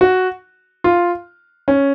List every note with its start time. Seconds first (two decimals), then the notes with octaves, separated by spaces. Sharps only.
0.01 F#4
0.84 F4
1.68 C#4